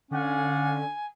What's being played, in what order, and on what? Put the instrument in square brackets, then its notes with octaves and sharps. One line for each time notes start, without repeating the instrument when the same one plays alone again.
[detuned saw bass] D3 [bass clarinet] C#4 [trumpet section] D5 F5 F#5 [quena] G#5